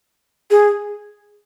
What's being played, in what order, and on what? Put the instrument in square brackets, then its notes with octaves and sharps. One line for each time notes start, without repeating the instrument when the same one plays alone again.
[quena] G#4